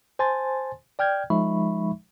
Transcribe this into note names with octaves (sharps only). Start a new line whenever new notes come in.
C5 G#5 A5 C6 A6
D5 G5 F6 G6 G#6
F3 G#3 D#4 E5 B5 C#6